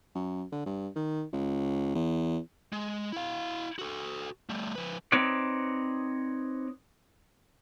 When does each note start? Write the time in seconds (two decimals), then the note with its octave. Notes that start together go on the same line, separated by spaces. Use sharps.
0.15 F#2
0.52 D3
0.66 G2
0.96 D#3
1.33 C#2
1.95 E2
2.73 G#3
3.12 E4 F5
3.79 F#4 A4
4.49 G3 A3
4.76 F3 B4
5.12 C4 D#4 B4 C#5 D5